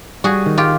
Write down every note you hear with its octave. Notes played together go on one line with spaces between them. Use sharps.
G3 F#4 G#4
D#3
F4 G4